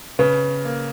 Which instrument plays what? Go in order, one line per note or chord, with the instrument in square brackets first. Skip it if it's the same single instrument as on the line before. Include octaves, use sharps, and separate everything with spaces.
[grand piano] C#3 [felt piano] B4
[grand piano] A#3